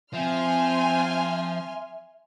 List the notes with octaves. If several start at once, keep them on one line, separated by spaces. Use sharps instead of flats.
F3 C4 E5 G#5 C6 F6